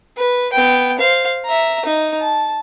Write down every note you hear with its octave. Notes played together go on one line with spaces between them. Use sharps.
B4
B3 G5
C5 F5
E5 A#5
D#4
A5